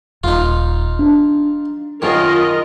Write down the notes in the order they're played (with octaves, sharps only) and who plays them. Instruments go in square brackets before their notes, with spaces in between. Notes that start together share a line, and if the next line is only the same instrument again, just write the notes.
[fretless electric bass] D#1 [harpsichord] D#4 F4
[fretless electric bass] D4
[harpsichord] F#2 D#3 [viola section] F4 A#4 D#5